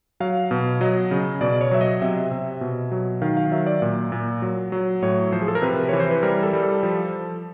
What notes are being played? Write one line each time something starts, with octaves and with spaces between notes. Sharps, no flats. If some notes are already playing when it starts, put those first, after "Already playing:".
F#3 F5
B2
F#3 D#5
C#3
B2 D5
C#5
F#3 E5
D#5
C3 E5
C3
B2
F#3
D#3 F5
F5
F#3 E5
D5
A#2
A#2
F#3
F#3
A2 C#5
F3 C5
G#4
A4
A#4
C3 B4
E3 C#5
C5
B4
G3 A#4
A4
G3
A4
F3